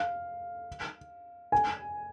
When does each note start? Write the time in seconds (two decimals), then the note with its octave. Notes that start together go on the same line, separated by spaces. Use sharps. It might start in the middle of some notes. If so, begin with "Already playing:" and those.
Already playing: F5
1.52 G#5